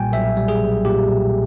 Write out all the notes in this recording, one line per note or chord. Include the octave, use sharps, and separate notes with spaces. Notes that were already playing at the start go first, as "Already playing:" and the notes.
Already playing: B1 A#2 G3 G5 G#5
B1 E5
G3
G#4
B1
A#2 G4
B1